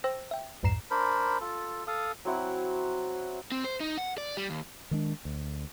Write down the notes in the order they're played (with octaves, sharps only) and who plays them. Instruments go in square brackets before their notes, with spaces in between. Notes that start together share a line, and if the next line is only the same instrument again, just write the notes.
[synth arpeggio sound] C5 G5 E6 A#6
E5 G5
B1 F2 G#2 A#5 C7 E7
[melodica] D4 A#4 C5 B5
F4 A4
A4 F5 D#6
[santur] F#3 C4 E4 F#5
[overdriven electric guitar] C4
C5
D#4
F#5
D5
G3
D#2
[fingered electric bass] D#3 G#3 D4
D2